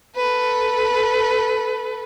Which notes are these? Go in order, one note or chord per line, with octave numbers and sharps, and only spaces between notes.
A4 B4